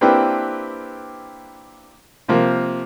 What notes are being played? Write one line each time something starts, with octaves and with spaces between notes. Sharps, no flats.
A#3 C4 D4 E4 G4 B4
C3 F3 A#3